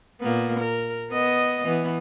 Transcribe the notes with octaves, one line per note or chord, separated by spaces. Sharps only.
A#2 A#3 B3
A#4
B3 D#5
E3 B3